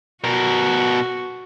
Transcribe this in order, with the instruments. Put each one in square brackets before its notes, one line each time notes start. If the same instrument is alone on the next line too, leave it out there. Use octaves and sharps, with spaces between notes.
[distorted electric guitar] B2 A#4 [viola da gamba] F#4